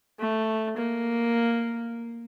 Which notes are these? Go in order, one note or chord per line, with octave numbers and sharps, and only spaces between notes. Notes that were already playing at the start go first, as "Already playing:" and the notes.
A3
A#3